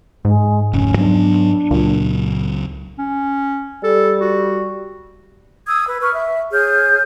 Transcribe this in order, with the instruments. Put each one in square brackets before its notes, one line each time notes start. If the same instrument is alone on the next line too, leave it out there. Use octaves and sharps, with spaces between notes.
[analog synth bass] G#2 [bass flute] G#3
[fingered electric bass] F1 D2 [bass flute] C#4
[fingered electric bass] F#3 B3 [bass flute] D4
[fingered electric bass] C#2 F#3 [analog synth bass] A#2
[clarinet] C#4
[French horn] G3 [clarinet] A4
[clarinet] F#4
[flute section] D#6 E6 G#6
B4
B4 C#6 F6
E5
G#4 C#5 F6 G6